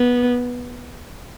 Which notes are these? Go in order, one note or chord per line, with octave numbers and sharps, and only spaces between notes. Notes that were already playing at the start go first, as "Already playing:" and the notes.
Already playing: B3